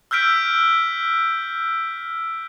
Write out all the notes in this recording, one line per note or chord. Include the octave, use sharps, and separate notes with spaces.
E6 F6 G6 B6 D7